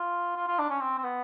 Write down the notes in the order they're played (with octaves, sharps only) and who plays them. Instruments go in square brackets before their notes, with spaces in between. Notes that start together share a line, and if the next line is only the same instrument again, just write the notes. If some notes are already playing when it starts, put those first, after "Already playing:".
Already playing: [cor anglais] F4
F4
F4
D4
C#4
C4
C4
B3